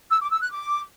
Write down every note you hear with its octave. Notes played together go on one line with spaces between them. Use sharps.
E6
D6
E6
F#6
D6